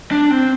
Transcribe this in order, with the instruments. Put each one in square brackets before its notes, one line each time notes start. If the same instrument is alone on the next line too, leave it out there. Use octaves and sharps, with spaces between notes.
[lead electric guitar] D4
C4